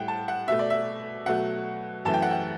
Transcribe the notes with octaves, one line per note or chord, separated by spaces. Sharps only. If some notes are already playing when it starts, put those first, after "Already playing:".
Already playing: A2 G3 F#5 G5
A5
F#5
B2 A3 E5
D5
E5
B2 F#3 A3 F#5
F#2 E3 A3 A5
G5
F#5
G5